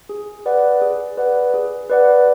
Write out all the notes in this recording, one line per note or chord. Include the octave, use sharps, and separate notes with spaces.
G#4
B4 D5 F#5
G#4
B4 D5 F#5
G#4
B4 D5 F#5